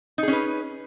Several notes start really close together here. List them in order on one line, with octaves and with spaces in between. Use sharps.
D#4 G#4 C#4 B4